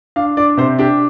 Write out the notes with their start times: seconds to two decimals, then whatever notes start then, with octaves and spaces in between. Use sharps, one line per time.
0.16 D4 F5
0.37 D4 D5
0.57 C3 C5
0.79 D4 G4